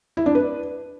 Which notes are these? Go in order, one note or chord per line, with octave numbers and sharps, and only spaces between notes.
E4
D4
B4